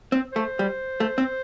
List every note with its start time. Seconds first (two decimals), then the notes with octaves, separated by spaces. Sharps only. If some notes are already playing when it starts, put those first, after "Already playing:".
0.12 C4 C5
0.32 A3 C5
0.59 G3
1.00 A3
1.18 C4